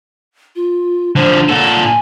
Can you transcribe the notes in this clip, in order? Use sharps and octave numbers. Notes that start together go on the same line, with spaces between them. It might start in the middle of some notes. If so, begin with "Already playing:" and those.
F4
D3 F3 C5
A#2 A4 F#5
G#5